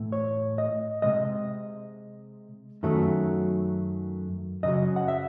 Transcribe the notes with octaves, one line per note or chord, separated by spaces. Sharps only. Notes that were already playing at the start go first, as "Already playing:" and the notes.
Already playing: A2 E3 A3
C#5
D#5
C3 E3 G#3 D#5
F#2 D#3 F#3 A3
F#2 C#3 F#3 D#5
F#5
E5